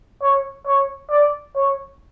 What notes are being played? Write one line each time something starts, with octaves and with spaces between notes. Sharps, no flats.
C#5
C#5
D5
C#5